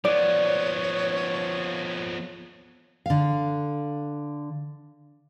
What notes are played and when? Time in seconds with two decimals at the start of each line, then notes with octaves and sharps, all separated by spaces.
0.05 F3 B3 C#5 D5
3.06 D3 F5